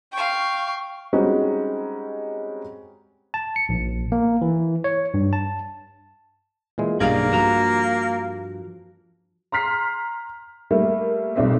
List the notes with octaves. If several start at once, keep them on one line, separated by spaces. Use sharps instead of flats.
F5 G5 C#6
G3 G#3 C4 C#4 D#4 F#4
A5
C#7
A#1
A#3
E3
C#5
G2
A5
A#2 E3 G#3
B1 G2 A#3 G#4 D5 F5
G2 F3 F#4 A#5
A#5 C6 F6 B6 C7
G3 A3 A#3
B1 G3 C4 D5 E5